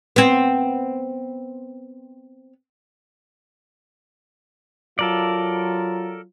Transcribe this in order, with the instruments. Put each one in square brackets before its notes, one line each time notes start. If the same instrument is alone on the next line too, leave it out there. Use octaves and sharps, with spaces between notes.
[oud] B3 C4
[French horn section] F#3 F4 [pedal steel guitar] A4 A#4 D5